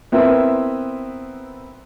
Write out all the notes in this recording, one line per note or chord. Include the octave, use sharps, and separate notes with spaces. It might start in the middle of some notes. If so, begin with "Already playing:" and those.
B3 C4 E4 A#4 B4